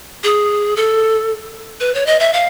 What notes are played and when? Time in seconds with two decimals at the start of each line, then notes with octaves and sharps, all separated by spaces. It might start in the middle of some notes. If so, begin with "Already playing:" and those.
0.24 G#4
0.76 A4
1.80 B4
1.95 C#5
2.06 D#5
2.20 E5
2.33 F5